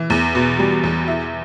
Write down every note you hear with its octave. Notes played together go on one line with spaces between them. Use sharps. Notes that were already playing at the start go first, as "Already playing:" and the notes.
Already playing: E3
E2
B2
G3
E2
E4